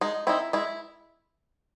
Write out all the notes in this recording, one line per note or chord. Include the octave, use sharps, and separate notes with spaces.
G#3 D#4
C4 D#4 E4
G#3 E4